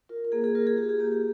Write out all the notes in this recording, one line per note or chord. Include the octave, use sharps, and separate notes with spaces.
F4 A#4
A#4
A#3 G#4
G#4
F4 A#4
G#4
F4 G4
G#4
A#3 G4
G#4